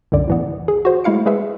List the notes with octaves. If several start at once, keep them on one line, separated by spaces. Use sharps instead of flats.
C2 F#2 D3 D5
A2 E3 B3
G#4
F#4 C5
G#3 A3 E4 F5 C#7
G#3 G#4 B4 E5